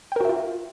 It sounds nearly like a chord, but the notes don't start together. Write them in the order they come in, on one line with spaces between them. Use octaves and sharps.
G5 A#4 F#4 E5 F4